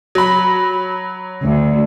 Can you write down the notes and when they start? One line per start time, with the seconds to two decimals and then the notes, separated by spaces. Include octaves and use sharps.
0.15 F#3 B5
1.43 D2